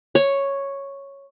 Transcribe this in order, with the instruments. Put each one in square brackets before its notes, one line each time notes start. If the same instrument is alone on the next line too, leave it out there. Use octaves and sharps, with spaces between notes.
[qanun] C#5